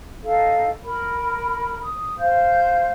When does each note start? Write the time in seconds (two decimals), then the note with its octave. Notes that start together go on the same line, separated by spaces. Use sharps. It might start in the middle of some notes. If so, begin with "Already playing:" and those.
0.23 D#4 A4 F5
0.83 A#4 B5
1.80 D#6
2.17 C5 F5 G6